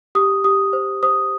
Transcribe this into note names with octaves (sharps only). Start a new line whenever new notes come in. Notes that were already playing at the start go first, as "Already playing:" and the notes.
G4 D#6
G4 D#6
C5
C5 D#6